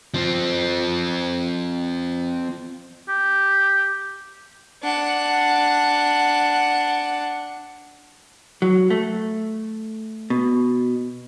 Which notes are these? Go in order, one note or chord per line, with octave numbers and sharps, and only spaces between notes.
F3 C4
G4
D4 F#5
F#3
A3
B2